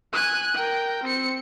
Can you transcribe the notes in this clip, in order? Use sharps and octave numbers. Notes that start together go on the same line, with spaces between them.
G#5 F#6
A#4 G5
C4 C#7